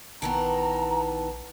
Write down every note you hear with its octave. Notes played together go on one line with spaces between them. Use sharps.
A#1 D#3 E3 B3 A5 A#5